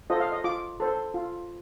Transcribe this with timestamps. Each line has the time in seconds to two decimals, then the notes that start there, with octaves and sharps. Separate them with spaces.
0.10 F4 A4 C5 D#5
0.20 F5
0.32 D#5
0.44 F4 D6
0.80 A4 C5
1.14 F4